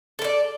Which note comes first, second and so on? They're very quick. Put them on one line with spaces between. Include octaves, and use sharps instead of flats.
A4 A#4 D5